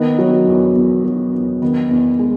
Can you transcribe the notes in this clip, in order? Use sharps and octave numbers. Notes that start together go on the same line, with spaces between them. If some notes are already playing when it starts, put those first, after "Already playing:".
Already playing: D#3 B3 D#4
F#3
E2
E2
F#3
E2
D#3 B3
E2
G#3